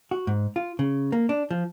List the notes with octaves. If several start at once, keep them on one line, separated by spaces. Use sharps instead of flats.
F#4
G#2
F4
C#3
A#3
D4
F3